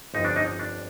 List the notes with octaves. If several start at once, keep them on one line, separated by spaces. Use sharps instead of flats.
G1 F2 D3 D#4
D4
D#4
D4